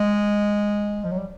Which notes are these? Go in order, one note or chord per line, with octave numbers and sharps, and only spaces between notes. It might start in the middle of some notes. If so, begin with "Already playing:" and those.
Already playing: G#3
F3
F#3
G3